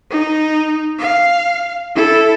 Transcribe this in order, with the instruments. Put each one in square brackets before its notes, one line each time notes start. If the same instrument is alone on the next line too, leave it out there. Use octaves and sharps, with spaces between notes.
[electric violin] D#4
F5
E4 A4